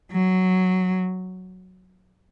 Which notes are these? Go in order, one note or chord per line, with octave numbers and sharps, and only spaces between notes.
F#3